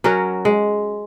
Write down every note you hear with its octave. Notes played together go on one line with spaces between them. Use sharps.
F#3 C#4 F#4 A#4
G#3